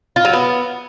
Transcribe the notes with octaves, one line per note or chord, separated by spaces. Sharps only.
F4
F#3
B3